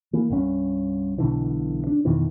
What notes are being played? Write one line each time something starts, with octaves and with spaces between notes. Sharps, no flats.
E3 A#3
C2 G2 C#4
B1 B2 D3 E3
D4
F2 B2 D#3 E3